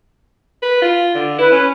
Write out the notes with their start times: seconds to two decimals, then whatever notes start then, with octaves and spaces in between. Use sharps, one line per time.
0.63 B4
0.82 F4
1.15 D3
1.38 E4 B4
1.52 C#4